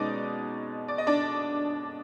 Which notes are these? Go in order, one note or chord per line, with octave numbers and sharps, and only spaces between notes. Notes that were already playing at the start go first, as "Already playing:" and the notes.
Already playing: B2 G#3 C#4 D#4 D5 D#5
D5
D#5
D4 D5